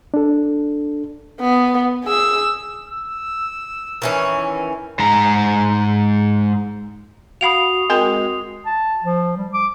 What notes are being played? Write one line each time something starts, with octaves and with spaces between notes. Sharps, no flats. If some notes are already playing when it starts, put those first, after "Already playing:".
D4 A4
B3
G#4 E6
E6
D#3 E3 C#4
G#2 A#5
F#4 F5 F#5 B5 D#6 C7 F7
G#3 C4 A#4 G5
A5
F3
G3
D6